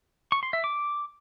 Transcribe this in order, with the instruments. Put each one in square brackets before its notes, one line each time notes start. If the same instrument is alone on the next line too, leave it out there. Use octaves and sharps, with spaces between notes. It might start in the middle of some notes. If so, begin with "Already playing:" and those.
[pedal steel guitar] C#6
C6
E5
D6